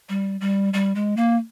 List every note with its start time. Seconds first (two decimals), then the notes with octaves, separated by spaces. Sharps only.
0.09 G3
0.41 G3
0.74 G3
0.95 G#3
1.17 A#3